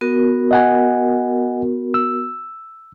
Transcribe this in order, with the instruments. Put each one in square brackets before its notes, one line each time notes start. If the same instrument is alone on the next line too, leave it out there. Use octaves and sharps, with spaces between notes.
[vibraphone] B3 F#4 A#4
[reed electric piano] D#5 F#5 G#5
E6